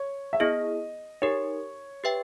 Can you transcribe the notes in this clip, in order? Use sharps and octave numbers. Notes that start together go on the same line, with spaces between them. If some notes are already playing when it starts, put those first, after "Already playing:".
Already playing: C#5
E5
B3 E4 G#4 D#5
D#4 G4 A#4 C#5
G4 B4 E5 G5